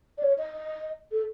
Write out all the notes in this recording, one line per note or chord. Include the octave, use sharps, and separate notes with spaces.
D5
C#5
D#5
A4